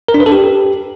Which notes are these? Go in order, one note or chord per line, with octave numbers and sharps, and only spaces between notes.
A#4
D4
B4
A4
G4